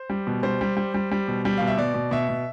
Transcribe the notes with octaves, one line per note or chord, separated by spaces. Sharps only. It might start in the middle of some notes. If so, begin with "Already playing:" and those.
Already playing: C5
G3
B2
G3 C5
G3
G3
G3
G3
B2
G3
B2 F5
E5
B2 D5
B2
B2 E5
B2